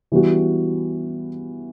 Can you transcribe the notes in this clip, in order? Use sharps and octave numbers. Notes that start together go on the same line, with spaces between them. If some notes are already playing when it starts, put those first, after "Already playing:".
E3 G3 B3 F#4